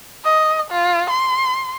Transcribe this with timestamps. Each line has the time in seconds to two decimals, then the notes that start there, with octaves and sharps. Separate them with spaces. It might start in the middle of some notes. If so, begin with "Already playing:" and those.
0.25 D#5
0.71 F4
1.10 C6